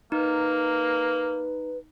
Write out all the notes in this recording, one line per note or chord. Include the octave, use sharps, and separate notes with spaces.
A#3 D#4 B4